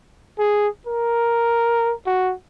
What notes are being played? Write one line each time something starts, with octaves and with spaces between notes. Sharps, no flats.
G#4
A#4
F#4